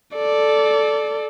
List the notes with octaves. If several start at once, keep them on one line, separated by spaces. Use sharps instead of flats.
A4 D5